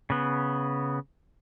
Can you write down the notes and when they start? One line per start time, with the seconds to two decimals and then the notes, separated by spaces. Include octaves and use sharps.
0.10 C#3 B3